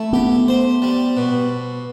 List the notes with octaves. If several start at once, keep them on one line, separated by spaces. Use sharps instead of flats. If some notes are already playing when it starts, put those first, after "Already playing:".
Already playing: A3 E4
B3 G4
C5
G3
B2